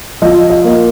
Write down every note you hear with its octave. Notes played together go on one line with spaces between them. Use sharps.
F3 D#5
D#5
A#3